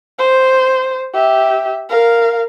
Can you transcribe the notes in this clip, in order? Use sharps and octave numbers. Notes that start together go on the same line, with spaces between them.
C5
G4 E5
A#4 F5